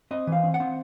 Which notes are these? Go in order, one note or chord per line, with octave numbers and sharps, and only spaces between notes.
C4 D#5
E3
F5
C4
F#5
C4